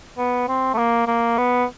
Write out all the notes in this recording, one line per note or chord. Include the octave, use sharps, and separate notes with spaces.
B3
C4
A3
A#3
A#3
B3